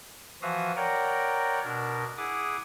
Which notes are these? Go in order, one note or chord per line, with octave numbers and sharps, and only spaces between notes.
E3 F3 F#4 E5 F5 D#6
A#4 C#5 D5 F#5 G5 A#5
B2 D4 A#4
E4 G#4 F#5 D6 D#6